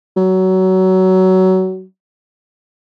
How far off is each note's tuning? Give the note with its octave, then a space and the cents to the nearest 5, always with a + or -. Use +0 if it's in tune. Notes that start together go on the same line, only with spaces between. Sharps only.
F#3 +20